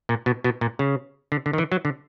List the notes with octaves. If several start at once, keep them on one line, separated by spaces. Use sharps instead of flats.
A#2
B2
B2
A#2
C#3
D3
D3
D#3
E3
F#3
D3